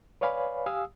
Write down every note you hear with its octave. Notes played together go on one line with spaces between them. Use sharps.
B4 C#5 D5 F5 G#5 B5
G4 F5 G#5 D#6 E6